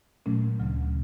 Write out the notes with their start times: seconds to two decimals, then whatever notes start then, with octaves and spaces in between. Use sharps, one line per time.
0.26 A#2 F#3 A3 C#4
0.59 D2 C#3 F#3